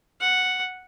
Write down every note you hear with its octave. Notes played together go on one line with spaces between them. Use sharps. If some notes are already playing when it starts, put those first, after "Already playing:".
F#5